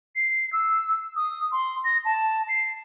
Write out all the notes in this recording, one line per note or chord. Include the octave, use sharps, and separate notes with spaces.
C7
E6
D#6
C6
A#6
A5
C7